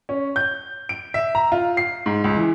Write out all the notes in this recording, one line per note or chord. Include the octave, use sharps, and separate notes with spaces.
C#4
G6
D7
E5
A#5
F4
C7
G#2
C#2
E3